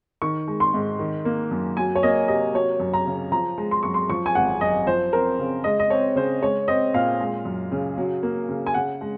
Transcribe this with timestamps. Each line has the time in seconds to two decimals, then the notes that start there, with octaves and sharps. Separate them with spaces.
0.22 D#3 C#6
0.48 G#3
0.60 C6
0.74 G#2
0.99 D#3
1.25 A#3
1.51 F#2
1.77 F#3 G#5
1.95 C#5
2.03 A#3 D#5
2.28 C3 D#5
2.54 F#3 C#5
2.80 F#2
2.93 A#5
3.06 C#3
3.32 F3 A#5
3.58 G#3
3.71 C6
3.83 F#2 C#6
3.94 C6
4.10 F3 C#6
4.26 G#5
4.35 G#1 F#5
4.61 F#2 D#5
4.87 F3 C5
5.13 C4 A#4
5.39 C#3
5.64 G#3 D#5
5.80 D#5
5.90 C4 C#5
6.16 C#3 C5
6.42 G#3 C#5
6.68 C4 D#5
6.94 A#2 F5
7.20 G#3
7.45 F#2
7.72 C#3
7.98 F#3
8.23 A#3
8.49 C#3
8.66 G#5
8.74 C#3 F#5
9.01 G#3